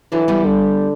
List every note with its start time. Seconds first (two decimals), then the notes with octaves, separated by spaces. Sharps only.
0.12 D3 E3 F#3
0.28 G3 B3
0.45 D3